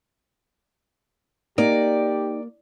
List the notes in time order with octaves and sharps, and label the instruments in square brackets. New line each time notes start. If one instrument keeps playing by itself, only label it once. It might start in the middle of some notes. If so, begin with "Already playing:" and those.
[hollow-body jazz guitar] A#3 [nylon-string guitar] D#4 [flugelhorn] G4 [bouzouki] D5